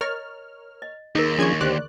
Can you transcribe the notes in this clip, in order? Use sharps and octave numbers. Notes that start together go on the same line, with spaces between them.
A#4 C#5 D#5 F6
D#5
D#2 D#4 G#4 A#4
F3 C#4 D4 G#4 G#5 C6 C#6 G#6
D2 G4 C5 D5 F#6